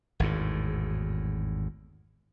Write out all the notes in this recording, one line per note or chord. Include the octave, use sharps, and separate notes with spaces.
G#1 E2 A2